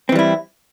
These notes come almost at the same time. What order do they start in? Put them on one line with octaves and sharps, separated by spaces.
C4 E3 G3 E4